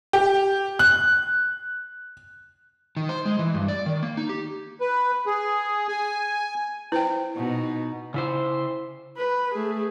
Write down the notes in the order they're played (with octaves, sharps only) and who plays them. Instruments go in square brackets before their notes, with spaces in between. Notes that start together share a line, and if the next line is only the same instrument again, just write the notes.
[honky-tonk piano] G4
F#6
[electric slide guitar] D#3
C5
G#3
E3
G2
D5
D#3
A#3
D#4
G4
[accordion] B4
G#4
G#5
[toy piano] E4 [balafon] B4 C5 G5
[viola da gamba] B2 D#4
[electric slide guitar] C#3 E4 C5
[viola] B4
A3 G#4